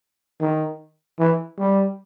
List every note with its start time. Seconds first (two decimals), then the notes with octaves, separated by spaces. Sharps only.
0.41 D#3
1.19 E3
1.59 G3